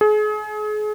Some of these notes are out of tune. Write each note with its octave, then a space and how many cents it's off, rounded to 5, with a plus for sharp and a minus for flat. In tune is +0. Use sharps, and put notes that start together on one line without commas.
G#4 +35